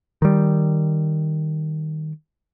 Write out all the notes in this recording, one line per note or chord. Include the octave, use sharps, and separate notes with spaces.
D#3 G3